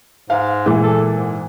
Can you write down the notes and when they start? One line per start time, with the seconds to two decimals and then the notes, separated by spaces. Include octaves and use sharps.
0.30 G#2 F5
0.66 A#2 E3 G#3
0.83 A4
1.14 G#2